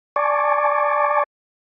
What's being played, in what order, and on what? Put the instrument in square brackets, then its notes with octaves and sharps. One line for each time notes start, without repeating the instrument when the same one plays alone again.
[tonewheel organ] D5 G#5 A5 C#6 D6